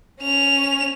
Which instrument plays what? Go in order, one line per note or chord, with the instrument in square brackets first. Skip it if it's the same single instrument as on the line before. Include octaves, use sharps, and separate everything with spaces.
[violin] C#4 F7